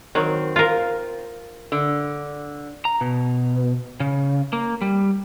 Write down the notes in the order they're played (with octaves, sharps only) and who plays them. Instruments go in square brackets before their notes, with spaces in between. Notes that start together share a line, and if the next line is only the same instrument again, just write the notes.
[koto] D#3 F#3 [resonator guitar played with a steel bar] C4
[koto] F4 A#4
[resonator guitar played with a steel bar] D3
[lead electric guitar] A#5
B2
C#3
A#3
G3